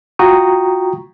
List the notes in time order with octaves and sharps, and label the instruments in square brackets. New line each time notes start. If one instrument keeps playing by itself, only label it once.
[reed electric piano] F4 F#4 G5 A#5 C#6 D#6